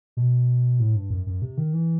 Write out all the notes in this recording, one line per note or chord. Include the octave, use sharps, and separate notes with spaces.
B2
A2
G2
F#2
F#2
C3
D#3
E3